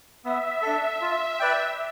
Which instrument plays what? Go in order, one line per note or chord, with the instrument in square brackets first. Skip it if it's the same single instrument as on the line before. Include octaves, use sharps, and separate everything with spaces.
[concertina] B3 [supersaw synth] E5
[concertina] D4 A4
F4
B4 D5 G5